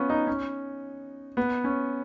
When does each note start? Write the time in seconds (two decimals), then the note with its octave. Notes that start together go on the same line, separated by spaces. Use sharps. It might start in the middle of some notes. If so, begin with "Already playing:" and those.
Already playing: B3 C#4 F4
0.10 D#4
0.27 C#4
1.37 B3
1.64 C#4